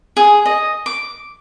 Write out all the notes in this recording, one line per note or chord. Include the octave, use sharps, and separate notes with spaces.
G#4
D#5
D6